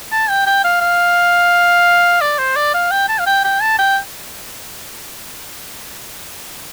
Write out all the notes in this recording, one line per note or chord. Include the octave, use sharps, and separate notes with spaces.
A5
G5
G5
F5
F5
D5
C5
D5
F5
G5
A5
F5
G5
G5
A5
G5